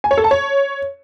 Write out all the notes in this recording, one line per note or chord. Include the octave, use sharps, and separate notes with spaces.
G#5
C#5
A4
A5
C#5